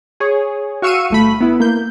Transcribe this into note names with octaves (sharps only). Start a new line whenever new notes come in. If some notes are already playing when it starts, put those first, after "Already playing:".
G#4 C#5
F#4 F5 C#6 E6 C#7 D#7
G1 A3 B5
B3 E4
A#3 G6